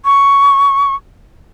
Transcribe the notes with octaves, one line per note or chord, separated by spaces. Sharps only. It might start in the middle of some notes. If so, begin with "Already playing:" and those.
C#6